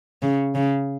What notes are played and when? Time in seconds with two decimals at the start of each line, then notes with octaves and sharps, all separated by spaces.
0.22 C#3
0.55 C#3